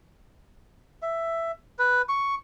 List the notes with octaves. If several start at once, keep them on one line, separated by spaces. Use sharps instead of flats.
E5
B4
C#6